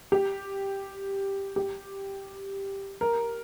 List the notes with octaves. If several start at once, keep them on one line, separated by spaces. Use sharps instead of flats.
G4
G4
A#4